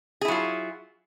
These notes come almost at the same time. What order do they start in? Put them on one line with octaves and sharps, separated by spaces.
G#4 E4 F#3 F4